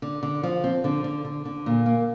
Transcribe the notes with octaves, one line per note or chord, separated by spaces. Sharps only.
D3
D3
F3
C4
D3
D3
D3
D3
A#2
A#3